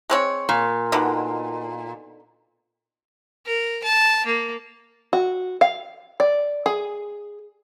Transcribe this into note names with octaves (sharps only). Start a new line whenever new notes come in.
G#3 C4 C#5
A#2
B2 D3 D#3
A#4
A5
A#3
F#4
F5
D5
G#4